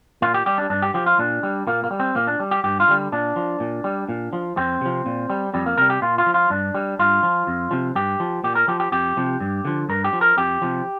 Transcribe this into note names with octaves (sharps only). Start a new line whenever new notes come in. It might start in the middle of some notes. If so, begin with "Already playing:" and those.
A#2 F4
G4
G3 G4
D4
G2 D4
G4
F3 G4
F4
A#2 D4
G3
A#2 A#3
A#3
G3
C4
A#2 A#3
D4
G3
G4
G2 G4
F4
D3 G3
A#2 D4
F3
A#2
G3
A#2
F3
F2 C4
C3 F3
A#2
G3
F2 G3
A#3
C3 G3 A#4
G4
A#2 F4
F4
F3
F4
G2 D4
G3
G2 F4
F3
F2
C3 F3
G2 G4
F3
A#2 G4
A#4
F3 G4
G4
F2 G4
C3 F3
G2
D3 F3
G2 A#4
G4
F3
A#4
F2 G4
C3 F3